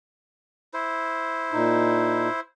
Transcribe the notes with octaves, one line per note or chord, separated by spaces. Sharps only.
E4 C5
A#2 D#4